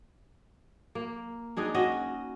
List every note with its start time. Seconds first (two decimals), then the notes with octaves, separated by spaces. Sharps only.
0.95 A#3
1.57 G#3 D4 D#4 G#4
1.74 C#4 F#4 D#5